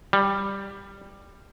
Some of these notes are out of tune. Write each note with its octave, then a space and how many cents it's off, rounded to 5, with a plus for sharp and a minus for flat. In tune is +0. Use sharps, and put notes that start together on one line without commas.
G3 +10